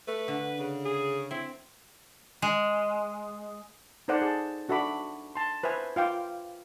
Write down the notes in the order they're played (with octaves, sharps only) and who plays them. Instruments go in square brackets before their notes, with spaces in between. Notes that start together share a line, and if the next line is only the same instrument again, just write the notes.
[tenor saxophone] A3 [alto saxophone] B4
[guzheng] D3
[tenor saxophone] C#3
[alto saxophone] G#4
[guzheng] C4 [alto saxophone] E4
[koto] G#3
[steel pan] D#4 A4 C5 D5 F#5 A5
G#4 A5
D4 F#4 A4 E5 B5 D6
A5 C6
B4 C5 E5 G#5
F4 F5 G5 D6